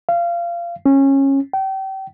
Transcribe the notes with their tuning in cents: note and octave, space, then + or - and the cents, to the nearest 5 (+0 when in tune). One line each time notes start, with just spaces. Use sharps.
F5 -25
C#4 -20
G5 -30